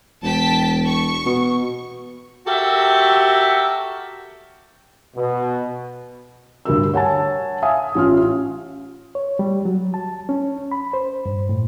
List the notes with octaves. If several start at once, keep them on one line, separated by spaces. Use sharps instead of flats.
E1 G5 A5 B6
C#6
B2
F#4 G4 A4 A#4 E5
B2
D2 G2 A#4 E6
C#5 F#5 G#5 A5
E5 F5 G#5 D#6
A1 C#4 F4 F6
C#5
G3
F#3
A5
C#4
B5
C5
G2
A2